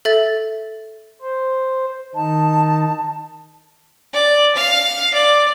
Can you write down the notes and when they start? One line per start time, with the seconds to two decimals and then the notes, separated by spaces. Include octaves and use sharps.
0.05 A4 E5 A6
1.21 C5
2.15 D#3 D#4 A5
4.13 D5
4.55 F5
5.14 D5